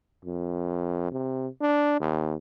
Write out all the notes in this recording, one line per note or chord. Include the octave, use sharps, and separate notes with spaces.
F2
C3
D4
D#2